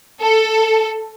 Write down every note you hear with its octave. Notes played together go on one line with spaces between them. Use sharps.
A4